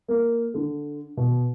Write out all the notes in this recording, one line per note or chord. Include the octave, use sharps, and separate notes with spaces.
A#3
D3
B2